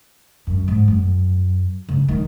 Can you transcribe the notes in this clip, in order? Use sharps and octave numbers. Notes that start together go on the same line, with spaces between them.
F#2
G#2
F#2
C#3
D#3